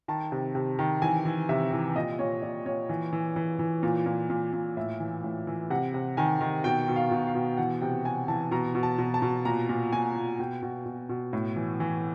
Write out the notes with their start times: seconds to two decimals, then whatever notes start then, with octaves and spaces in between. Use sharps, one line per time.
0.08 D#3 A5
0.32 C3
0.55 C3
0.79 D#3
1.02 E3 G#5
1.25 E3
1.49 C3 E5
1.72 E3
1.95 A#2 D#5
2.19 A#2 C#5
2.42 A#2 D5
2.66 A#2 C#5
2.89 E3
3.13 E3
3.36 E3
3.59 E3
3.83 A#2
4.06 A#2
4.30 A#2
4.53 A#2
4.77 A2 E5
5.00 E3
5.24 A2
5.47 E3
5.70 C3 F#5
5.94 C3
6.17 D#3 G#5
6.41 D#3
6.64 B2 G5
6.88 B2
6.96 F5
7.11 B2
7.27 F5
7.35 B2
7.57 E3 F#5
7.81 C3 G5
8.05 C3 G#5
8.28 E3 A5
8.51 B2 A#5
8.75 B2
8.83 A5
8.98 B2
9.14 A5
9.22 B2
9.45 A#2 A#5
9.69 A#2
9.93 A#2 G#5
10.15 A#2
10.39 B2 G5
10.62 B2
10.86 B2
11.09 B2
11.33 A2
11.56 E3
11.80 E3